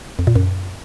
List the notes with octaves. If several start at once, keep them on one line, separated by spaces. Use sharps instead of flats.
F2
A#2
F#2